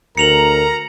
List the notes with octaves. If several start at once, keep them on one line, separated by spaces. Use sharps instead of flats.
D2 A#4 A#5 C#7 F7 F#7